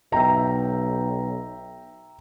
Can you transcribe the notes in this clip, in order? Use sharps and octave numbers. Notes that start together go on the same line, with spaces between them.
B1 E5 G5 A#5